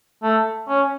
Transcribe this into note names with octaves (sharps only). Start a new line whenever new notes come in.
A3
C#4